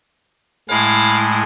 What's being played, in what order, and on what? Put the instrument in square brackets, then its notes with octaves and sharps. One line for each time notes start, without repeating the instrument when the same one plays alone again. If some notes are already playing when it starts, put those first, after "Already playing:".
[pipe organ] A2 G#3 [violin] E4 [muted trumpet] F5